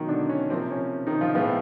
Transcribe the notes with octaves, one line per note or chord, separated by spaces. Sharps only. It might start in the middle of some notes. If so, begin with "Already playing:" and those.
Already playing: B2 D#3 F#3 A#3 D#4
D3 D4
C#4
C3 F3 A#3 C4
C#4
D#3 D#4
F3 F4
A2 F3 G#3 B3 F4